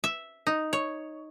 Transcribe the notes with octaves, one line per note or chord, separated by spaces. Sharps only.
E5
D#4
C#5